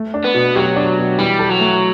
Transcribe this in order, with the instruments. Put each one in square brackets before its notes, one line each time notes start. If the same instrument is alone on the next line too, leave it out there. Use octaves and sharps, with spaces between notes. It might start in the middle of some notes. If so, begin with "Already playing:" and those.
Already playing: [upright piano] A3
D4
[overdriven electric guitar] B3
[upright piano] B2
[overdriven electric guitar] F#3 [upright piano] G4
[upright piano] D4
B2
[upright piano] E3 [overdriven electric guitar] G3
[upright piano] A4
[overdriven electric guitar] F#3
[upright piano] A3